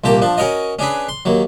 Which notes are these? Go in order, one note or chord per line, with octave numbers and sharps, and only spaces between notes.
C2 A#2 G4 A5 A#5
F3 D4
C#4 F#4 A#4 C#5 D#5
C#4 D4 G#4 B4
C6
D#2 F#3